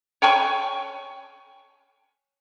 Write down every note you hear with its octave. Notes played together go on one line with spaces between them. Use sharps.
C#5 G5 G#5 C#6